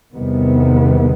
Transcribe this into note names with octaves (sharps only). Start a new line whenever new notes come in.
E2 C3 D#3 G3 B3